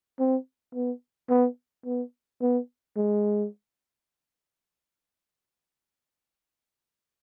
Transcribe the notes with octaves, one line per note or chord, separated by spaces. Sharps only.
C4
B3
B3
B3
B3
G#3